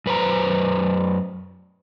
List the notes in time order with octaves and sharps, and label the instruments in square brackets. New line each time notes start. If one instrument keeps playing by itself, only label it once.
[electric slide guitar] F#2 B4 C5 A#5